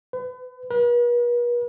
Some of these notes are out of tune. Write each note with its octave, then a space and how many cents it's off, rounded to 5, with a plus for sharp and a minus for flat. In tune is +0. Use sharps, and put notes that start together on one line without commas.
B4 +35
B4 -45